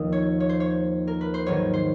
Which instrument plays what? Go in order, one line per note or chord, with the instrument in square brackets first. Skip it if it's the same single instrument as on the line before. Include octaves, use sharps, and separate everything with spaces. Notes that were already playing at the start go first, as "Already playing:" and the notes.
Already playing: [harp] D#2 F3 A#3 D#5
C#5
C#5
C5
C#5
A#4
B4
C5
G#2 D#3 F#3 B3 C#5
C5